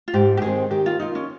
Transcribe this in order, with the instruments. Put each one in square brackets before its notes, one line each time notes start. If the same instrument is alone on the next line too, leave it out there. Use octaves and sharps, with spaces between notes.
[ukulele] F4
[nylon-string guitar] G#2 [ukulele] G4
[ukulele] G4
[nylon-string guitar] D#3 G#3 C4 [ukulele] G#4
[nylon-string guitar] D#3 [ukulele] G4
[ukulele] F4
[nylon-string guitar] A#3 F4 [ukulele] D#4
[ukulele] C#4